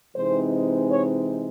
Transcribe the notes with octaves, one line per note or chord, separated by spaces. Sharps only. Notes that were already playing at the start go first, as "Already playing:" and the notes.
C3 E3 G#3 C4 D#4 C5
C#5